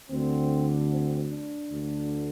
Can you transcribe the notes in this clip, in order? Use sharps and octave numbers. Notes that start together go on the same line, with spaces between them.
D2 D3 C4
C4
D4
D2 D3